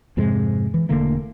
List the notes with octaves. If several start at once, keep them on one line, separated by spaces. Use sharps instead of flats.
F2 G#2 C3 G#3
E3
E1 D3 A3 A#3